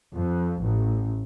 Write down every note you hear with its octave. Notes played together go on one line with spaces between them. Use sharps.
F2
A1